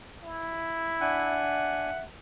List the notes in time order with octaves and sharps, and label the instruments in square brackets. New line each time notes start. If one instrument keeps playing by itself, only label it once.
[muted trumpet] E4
[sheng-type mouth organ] D4 G#5 [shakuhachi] E5 [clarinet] F#5